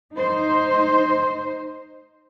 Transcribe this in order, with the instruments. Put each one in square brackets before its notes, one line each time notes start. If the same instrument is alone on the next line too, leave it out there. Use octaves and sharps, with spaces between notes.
[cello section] D#4 C5